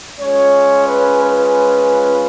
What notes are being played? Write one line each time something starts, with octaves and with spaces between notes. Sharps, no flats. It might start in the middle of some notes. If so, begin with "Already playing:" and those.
G#3 C#4 F4 C#5
B4
B4